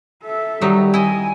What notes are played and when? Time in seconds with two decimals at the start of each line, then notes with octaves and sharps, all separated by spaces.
0.25 A4 E5
0.61 D#3 F#3 G3 D#4
0.94 E4 D#5 G#5